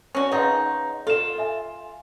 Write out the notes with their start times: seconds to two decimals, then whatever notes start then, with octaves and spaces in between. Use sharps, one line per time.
0.15 C#4 F#4
0.32 C#3 D#4 B4 F#5 C6
1.07 F4 A4 E7
1.39 E5 G#5